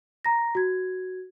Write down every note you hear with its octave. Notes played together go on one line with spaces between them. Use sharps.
A#5 A#6
F#4 G#6